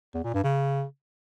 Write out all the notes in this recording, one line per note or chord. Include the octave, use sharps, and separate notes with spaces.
E2
A#2
G2
C#3